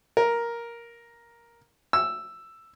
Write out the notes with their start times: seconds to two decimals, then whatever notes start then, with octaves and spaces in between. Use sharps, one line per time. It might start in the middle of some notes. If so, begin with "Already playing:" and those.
0.17 A#4
1.93 E6